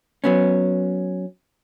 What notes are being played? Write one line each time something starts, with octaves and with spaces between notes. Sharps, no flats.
F#3 B3 C#4